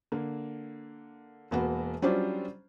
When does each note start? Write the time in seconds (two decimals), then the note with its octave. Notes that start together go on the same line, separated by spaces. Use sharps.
0.12 D3 A#3
1.51 E1 A#3 B3 F#4
2.02 F#3 G3 C#4 D4 F4 C5